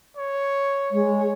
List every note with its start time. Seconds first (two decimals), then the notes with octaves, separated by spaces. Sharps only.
0.17 C#5
0.91 G#3 C#5